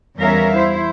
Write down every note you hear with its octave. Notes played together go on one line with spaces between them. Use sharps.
E2 G3 C#4 A#4 E5 F5
E4 C5